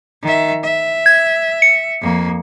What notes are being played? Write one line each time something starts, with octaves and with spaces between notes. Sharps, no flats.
D#3 E5
E5
G#6
C#7
F2 A#3